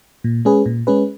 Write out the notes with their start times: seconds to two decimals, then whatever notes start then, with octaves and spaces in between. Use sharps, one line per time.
0.24 A#2
0.45 G#3 C#4 G#4 B4
0.66 A#2
0.87 G#3 C#4 G#4 B4